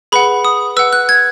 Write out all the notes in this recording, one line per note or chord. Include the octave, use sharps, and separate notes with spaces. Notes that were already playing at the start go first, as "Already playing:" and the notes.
G#4 B4 F#5 B5
D#6
B4 F#5 E6
F#6
G#6